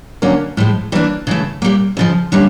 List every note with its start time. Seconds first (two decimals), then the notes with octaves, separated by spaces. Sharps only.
0.22 D3 F#3 A#3 C#4
0.57 A2 F3 G#3
0.92 E3 G3
0.95 A#3 D4
1.27 C#3 E3 A3
1.62 A#2 G3 A#3
1.97 F2 C#3 F3
2.32 D3 G3 A#3 C#4